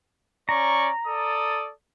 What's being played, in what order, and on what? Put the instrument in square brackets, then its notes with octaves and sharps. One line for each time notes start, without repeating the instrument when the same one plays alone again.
[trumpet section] C#4 D5 C#6 [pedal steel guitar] A#5
[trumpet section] A4 D5 D#6